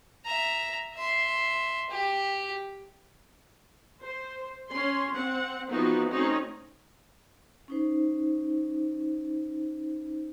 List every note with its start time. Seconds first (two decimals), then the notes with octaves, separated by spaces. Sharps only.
0.25 E5 A#5
0.95 E5 C6
1.90 G4
4.02 C5
4.70 C#4 C6
5.13 C4 F#5
5.70 E3 F3 B3 C4 D#4 F#4
6.09 A3 C4 C#4 D#4 F#4
7.68 C#4 D#4 C5